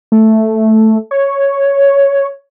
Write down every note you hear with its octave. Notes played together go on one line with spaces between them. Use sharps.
A3
C#5